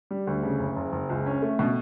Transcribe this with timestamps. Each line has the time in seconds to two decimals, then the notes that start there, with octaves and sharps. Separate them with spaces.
0.11 G3
0.27 D2
0.43 C#3
0.59 F#1
0.76 F#1
0.92 F#1
1.09 C#2
1.26 C#4
1.42 A3
1.59 B2